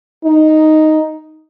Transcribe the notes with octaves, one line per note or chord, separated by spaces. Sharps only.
D#4